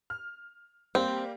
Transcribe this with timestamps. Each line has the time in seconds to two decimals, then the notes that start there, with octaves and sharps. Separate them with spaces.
0.10 F6
0.95 G3 A#3 C4 G4